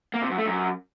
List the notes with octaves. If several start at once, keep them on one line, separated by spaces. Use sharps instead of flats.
A#3
C3
F#2
A3
F#2